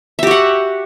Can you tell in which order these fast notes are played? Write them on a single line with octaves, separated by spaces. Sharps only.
E5 G4 F#4 F#5